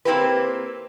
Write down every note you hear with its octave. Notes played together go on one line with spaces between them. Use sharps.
A#3 C4 E4 G4 B4